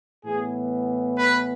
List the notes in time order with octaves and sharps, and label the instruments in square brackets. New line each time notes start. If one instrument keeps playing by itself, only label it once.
[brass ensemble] A2 E3 B3 G#4
B4